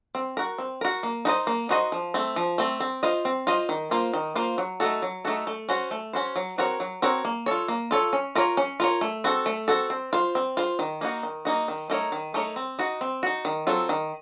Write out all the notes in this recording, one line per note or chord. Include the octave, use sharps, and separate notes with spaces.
C4
F#4 A#4
C4
F#4 A#4
A#3
D#4 F#4 C5 D#5
A#3
D#4 F#4 C5 D#5
F3
A3 C4
F3
A3 C4
C4
F4 C5 D#5
C4
F4 C5 D#5
D#3
A#3 F4 C5
D#3
A#3 F4 C5
F#3
A3 D#4 F#4 A4
F#3
A3 D#4 F#4 A4
A3
C#4 F#4 C5
A3
C#4 F#4 C5
F#3
C4 F#4 A#4 C#5
F#3
C4 F#4 A#4 C#5
A#3
F4 A4 C#5
A#3
F4 A4 C#5
C#4
F4 A#4 C#5
C#4
F4 A#4 C#5
A3
C4 F#4 A4
A3
C4 F#4 A4
C4
F4 C5
C4
F4 C5
D#3
A#3 D#4 F#4
D#3
A#3 D#4 F#4
D#3
A3 D#4 A#4 C#5
D#3
A3 D#4 A#4 C#5
C4
D#4 F#4
C4
D#4 F#4
D#3
F#3 C4 F4 A4
D#3